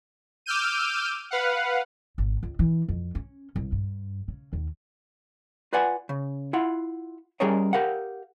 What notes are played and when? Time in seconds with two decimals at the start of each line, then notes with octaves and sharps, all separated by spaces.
0.46 D6 E6 F6 G6 D#7
1.31 B4 F5 F#5
2.18 G#1
2.43 C#2
2.59 E3
2.88 F2
3.15 C#4
3.56 C2
3.72 G2
4.28 C#3
4.53 D#2
5.73 F4 B4 D5 F#5 G#5
6.09 C#3
6.53 E4 F4 F#5
7.40 G3 C#4 G#4 A#4 C#5 D#5
7.73 G4 A#4 F5 F#5